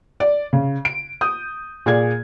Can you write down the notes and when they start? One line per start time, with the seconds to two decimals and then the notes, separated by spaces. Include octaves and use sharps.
0.20 D5
0.53 C#3
0.85 D7
1.21 D#6 G6
1.86 A#2 G#4 D5 G#6